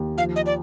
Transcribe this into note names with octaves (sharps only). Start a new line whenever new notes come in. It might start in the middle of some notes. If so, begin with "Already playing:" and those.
Already playing: D#2
F3 F5
D#5
D5